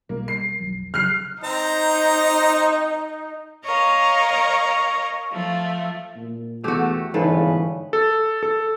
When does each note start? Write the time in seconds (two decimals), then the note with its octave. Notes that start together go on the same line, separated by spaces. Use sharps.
0.09 B1 B2 G3 A#3
0.28 C7
0.60 F1 B1 F#3
0.94 C#3 F#3 F6 F#6 C7
1.44 C4 D#4 C5 A#5
3.65 A#4 C#5 D#5 F5 A#5
5.31 F3 A3
6.16 A#2
6.64 E2 A3 F#4 G4
7.14 G1 G#2 C#3 E3 A4 B4
7.93 A4
8.43 A4